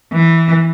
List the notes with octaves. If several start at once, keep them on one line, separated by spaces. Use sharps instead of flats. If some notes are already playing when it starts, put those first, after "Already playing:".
E3